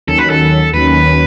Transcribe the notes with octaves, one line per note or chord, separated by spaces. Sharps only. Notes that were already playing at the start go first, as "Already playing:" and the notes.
D#2 D#3 F#3 C#4 A4
B4
A4
D#2 D#3 F#3 C#4 B4